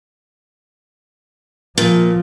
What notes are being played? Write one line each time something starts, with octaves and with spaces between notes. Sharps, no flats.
A#2 F3